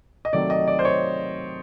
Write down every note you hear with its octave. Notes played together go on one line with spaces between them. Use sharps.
D#5
C3 D#3 F#3 A3 D5
D#5
D5
C5
C#5